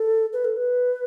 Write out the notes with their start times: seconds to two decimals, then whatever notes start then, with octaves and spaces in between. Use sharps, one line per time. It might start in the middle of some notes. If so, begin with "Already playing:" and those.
Already playing: A4
0.33 B4
0.45 A4
0.57 B4